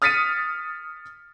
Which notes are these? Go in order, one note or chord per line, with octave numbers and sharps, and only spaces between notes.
D#6 F6 A6 B6 C#7 D#7